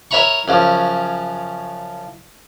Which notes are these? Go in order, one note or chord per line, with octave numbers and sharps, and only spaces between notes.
A#4 C#5 E5 A#5 B5 C#6
F#2 C#3 F3